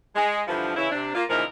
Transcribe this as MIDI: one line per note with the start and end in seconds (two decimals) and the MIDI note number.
0.16 0.41 56
0.48 0.76 43
0.48 0.76 50
0.48 0.76 52
0.48 0.76 53
0.76 0.88 49
0.76 0.88 52
0.76 0.88 61
0.76 0.88 64
0.91 1.13 48
0.91 1.13 62
1.14 1.23 58
1.14 1.23 65
1.29 1.43 46
1.29 1.43 49
1.29 1.43 52
1.29 1.43 53
1.29 1.43 63
1.29 1.43 70